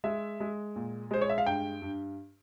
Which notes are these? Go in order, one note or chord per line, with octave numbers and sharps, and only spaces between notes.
G#3 E5
G#3
A#2
G#3 C5
C#5
E5
F5
G2 G5
G2